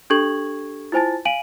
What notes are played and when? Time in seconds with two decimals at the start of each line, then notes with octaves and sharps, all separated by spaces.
0.10 D4 G4 A4 C#6 G#6 F#7
0.92 E4 F4 C5 G#5 A5 A6
1.25 F5 G#5 D7 D#7 F#7